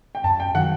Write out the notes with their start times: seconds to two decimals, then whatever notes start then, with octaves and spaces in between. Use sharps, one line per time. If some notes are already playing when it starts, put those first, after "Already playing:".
0.15 G5
0.24 F#2 A5
0.40 G5
0.55 D#3 F#3 F#5